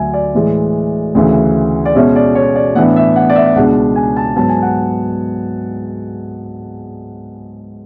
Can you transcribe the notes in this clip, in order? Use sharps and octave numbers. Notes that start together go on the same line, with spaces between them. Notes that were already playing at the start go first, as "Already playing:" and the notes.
Already playing: D2 D3 F#3 E5 G#5
D5
A2 E3 G#3
D2 C#3 E3
D5
B2 G#3 C#4 E5
D5
C#5
D5
A2 E3 B3 D4 F#5
E5
F#5
D5
E5
C#2 B2 G#3 D4 F#5
G#5
A5
G#2 F#3 B3 A5
G#5
F#5